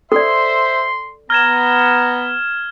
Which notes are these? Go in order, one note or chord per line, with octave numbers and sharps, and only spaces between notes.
A4 C5 D5 E5 C6
B3 A#5 F6 G#6 E7